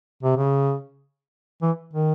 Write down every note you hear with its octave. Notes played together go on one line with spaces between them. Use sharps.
C3
C#3
E3
D#3